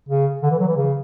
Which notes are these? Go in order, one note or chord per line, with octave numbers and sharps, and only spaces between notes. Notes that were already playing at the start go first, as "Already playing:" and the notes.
C#3
D3
E3
F#3
E3
C#3